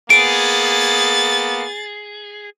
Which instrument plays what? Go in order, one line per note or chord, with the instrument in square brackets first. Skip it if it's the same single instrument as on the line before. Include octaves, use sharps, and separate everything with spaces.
[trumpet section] A#3 B3 [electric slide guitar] G#4 [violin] A6 [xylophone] D7